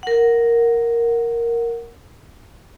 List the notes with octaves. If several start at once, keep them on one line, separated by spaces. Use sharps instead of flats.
A#4 F#5